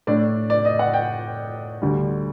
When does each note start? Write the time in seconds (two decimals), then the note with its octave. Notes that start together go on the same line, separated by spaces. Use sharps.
0.07 A2 A3 D4 D5
0.50 D5
0.65 D#5
0.79 F#5
0.94 G5
1.82 D2 D3 G3